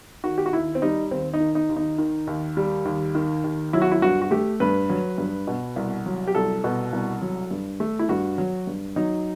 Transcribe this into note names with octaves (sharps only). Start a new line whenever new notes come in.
D#3 F#4
G4
F#4
D#2 E4
C4
G3 D#4
D#2 C4
D#4
D#3
D#4
D#2
D#4
D#3
D#2
G3
D#2
D#3
D#2
F#3 E4
F#4
E4
G2 F#4
F#4
A3 G4
G2 B4
F#3
G2
B2
C2
F#3
G4
C2 A4
B2
C2
F#3
G2
A3
E4
G2 F#4
F#3
G2
F#3 D#4